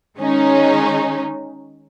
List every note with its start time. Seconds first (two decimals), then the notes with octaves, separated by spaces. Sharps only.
0.18 D#3 G#3 C#4 D#4